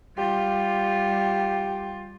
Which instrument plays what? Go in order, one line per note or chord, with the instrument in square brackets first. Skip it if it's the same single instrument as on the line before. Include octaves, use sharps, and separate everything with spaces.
[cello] G3 F4 [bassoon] G4